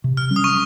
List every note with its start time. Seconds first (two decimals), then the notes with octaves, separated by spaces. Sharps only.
0.04 C3
0.17 F6
0.31 G3 C#4
0.36 D#6
0.44 C#6